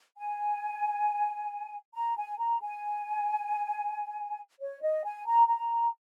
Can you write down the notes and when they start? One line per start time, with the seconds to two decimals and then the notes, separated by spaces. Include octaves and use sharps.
0.17 G#5
1.94 A#5
2.17 G#5
2.38 A#5
2.61 G#5
4.60 C#5
4.82 D#5
5.04 G#5
5.27 A#5
5.48 A#5